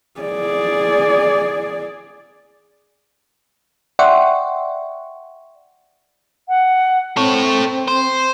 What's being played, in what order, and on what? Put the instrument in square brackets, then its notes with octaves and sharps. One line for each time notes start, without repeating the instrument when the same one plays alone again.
[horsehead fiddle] G#4 D5
[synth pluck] D5 E5 F#5 G5 C6 C#6
[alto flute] F#5
[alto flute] C4 [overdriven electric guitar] A4 C#5
[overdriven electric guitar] C5